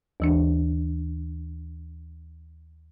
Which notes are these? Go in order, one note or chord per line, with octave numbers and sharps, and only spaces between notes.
D#2 E3 D4